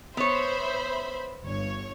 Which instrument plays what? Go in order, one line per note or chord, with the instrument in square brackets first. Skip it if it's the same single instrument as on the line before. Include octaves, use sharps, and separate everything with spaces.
[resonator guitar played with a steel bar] B3 C#5 [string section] C5 E5 B5
[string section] G1 C#5